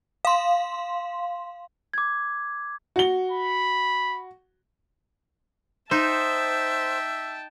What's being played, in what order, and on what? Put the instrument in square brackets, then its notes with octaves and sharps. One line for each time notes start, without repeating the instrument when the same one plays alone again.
[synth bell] F5 C6
[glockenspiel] D6 G#6
[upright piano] F#4 G7
[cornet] B5
[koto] D#4 [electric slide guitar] C5 [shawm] E5 [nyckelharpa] G5 A5